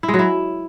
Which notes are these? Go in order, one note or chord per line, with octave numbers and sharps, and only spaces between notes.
E4
G#3
F#3
E4